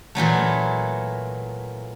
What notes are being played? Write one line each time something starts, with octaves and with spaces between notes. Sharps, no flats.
A#2 E3 F#3 A3